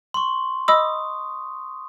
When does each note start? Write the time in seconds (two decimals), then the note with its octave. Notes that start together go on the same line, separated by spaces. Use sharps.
0.14 C6 C#6
0.68 D#5 B5 D#6 E6